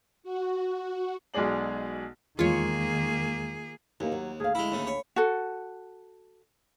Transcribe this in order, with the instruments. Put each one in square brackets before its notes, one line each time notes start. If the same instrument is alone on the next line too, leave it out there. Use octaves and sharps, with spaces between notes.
[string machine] F#4
[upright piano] B1 B2 G#3 G#4 D5 F#7
[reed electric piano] E2 G#3 [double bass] D#3 [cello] A#3 G#4 [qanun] F4 C#5
[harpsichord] D#2 [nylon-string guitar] E3 A#3 D#4
[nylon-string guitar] F#3
[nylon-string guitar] D2 F5 [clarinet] G#4
[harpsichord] G#3 E4 [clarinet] B5
[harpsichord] D#2 C#3 A3
C#5
[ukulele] F#4 A4